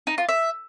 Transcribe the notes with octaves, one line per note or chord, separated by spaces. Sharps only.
D#4
F4
E5